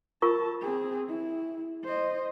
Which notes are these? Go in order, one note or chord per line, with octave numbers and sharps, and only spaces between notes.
F4 A#4 A5 C#6
C4 G#4
E4
C5 D#5